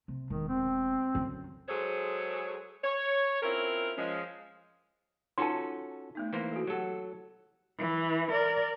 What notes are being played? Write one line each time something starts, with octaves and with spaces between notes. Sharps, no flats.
C3
E1 D#3
C4
F#2 D3
F#3 G#3 G#4 A4 C5 C#5
C#5
C4 C#4 E4 F4 A#4
F3 G#3 C#4
C#4 D#4 F4 F#4 A4 A5 C6
A3 B3 D#4
E3 A#3 C5
F#4 A4
F#3 G4 A4 F#5
E3
A#4 D5